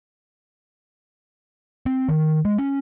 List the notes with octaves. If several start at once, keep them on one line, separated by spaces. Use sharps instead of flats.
C4
D#3
G#3
C#4